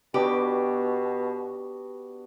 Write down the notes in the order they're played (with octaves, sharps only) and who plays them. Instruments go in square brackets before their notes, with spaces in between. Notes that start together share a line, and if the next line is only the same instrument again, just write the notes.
[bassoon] B2 [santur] B3 D4 F#4 [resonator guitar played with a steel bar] G4